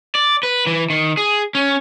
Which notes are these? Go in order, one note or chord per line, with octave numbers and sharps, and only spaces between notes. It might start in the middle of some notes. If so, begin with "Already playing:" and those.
D5
B4
E3
D#3
G#4
C#4